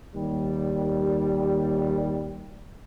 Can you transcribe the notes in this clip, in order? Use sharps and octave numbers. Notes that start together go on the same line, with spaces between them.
D#2 G3